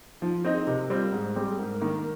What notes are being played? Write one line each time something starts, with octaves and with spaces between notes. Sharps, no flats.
F3 D#4
F4
C4 D#4 A#4
G#4
C3 A#4
G3 C4 F4
G#2 G#4
G3 C4 G4
G#4
G#2 A#4
D#3 A#3